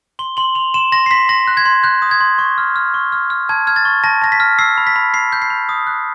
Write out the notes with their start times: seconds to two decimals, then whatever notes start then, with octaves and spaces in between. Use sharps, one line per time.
0.19 C6 G7
0.37 C6 F#7
0.55 C6 F7
0.74 C6 E7
0.92 C6 A#6
1.06 C7
1.11 C6 B6
1.29 C6 A#6
1.47 F#6
1.57 G#6
1.66 C6
1.84 F#6 G6
2.02 D#6
2.11 G#6
2.21 C6
2.39 C#6
2.58 F6
2.76 F6
2.94 C#6
3.12 F6
3.30 F6
3.49 A5 G#6
3.67 F6 G#6
3.76 A6
3.85 C#6
4.04 A5 A#6
4.22 A5 A#6
4.32 B6
4.40 F6
4.59 E6 C7
4.78 B5
4.87 B6
4.96 B5
5.14 B5 C7
5.32 G6
5.42 C7
5.50 B5
5.69 D#6
5.87 F#6